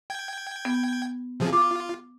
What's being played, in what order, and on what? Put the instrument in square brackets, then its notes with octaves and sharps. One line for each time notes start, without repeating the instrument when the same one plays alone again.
[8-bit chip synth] G5 G#6
[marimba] B3
[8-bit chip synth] C3 F3 G#4
[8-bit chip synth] F4 [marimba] D6